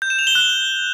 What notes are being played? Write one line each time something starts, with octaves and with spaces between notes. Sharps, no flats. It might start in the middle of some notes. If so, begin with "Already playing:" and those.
G6
E7
F7
G7
F#6